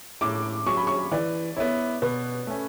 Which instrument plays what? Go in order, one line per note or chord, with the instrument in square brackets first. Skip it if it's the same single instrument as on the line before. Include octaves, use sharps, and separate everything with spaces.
[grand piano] A2 [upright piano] D6
[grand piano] F#3 C#4 [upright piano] C#6
[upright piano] B5
C#6
[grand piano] E3 [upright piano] D5
[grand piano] B3 E4 [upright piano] C#5
[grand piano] B2 [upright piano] B4
[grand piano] A3 C#4